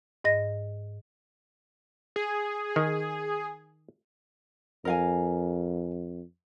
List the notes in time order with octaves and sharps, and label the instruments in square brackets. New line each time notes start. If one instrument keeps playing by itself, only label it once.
[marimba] G#2 D#5 A#6
[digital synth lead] G#4
[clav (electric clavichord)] D#3
[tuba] F2 [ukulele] A#4 F5 G#5